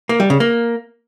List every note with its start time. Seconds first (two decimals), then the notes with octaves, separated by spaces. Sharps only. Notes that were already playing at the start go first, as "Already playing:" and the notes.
0.09 A#3
0.20 G3
0.30 C#3
0.40 A#3